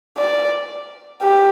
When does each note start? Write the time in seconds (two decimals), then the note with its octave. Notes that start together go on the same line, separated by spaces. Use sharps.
0.18 D5
1.22 G4